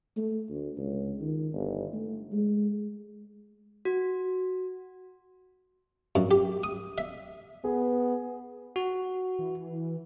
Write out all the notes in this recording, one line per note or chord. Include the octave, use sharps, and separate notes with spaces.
A3
D2
C#2
D#3
G1
A3
G#3
F#4
F#2
G4
D#6
E5
B3 G#4
F#4
E3